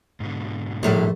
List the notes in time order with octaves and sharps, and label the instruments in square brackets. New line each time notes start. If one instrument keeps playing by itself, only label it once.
[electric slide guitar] G#2 B2 D3
[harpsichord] A#1 A3 [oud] A2 F#3 G3